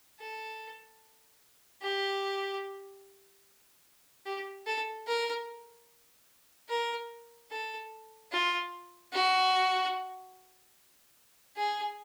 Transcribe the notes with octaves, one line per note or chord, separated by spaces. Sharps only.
A4
G4
G4
A4
A#4
A#4
A4
F4
F#4
G#4